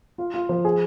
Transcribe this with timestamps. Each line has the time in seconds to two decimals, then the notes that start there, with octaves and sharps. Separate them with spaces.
0.18 F4
0.34 F4
0.49 F3
0.65 G#4